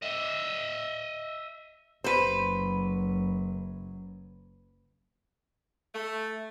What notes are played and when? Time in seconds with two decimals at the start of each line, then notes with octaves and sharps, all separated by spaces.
0.02 D#5 E5
2.04 F#1 F#3 B4 C5
5.94 A3